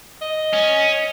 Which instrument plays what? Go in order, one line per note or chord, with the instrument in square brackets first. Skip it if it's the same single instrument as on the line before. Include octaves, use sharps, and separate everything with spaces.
[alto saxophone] D#5
[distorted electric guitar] C#4